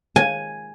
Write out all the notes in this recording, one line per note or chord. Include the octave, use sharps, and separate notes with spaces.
G#5